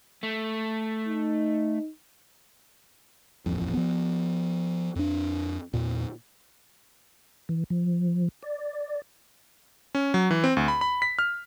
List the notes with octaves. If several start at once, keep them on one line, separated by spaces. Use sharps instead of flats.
A3
D#4
D#1 A1 F2
F3 B3
F2 D4
E2 A#2
E3
F3
D5
C#4
F#3
E3
C4
D2
B5
B5
B6
F6